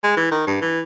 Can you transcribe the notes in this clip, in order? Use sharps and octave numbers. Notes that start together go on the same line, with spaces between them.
G#3
E3
D#3
G2
E3